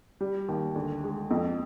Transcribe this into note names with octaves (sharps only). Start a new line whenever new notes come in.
G3
D#2
D2
G#3
F2